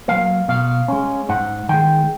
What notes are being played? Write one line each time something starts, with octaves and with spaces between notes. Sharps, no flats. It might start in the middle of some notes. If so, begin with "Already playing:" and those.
F#3 A#3 F5
B2 F5
G#3 C#4
G#2 F#5
D#3 G#3 G5